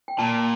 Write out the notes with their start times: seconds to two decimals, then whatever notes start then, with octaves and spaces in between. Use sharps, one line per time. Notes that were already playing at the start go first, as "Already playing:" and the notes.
0.08 G5
0.18 A#2 A5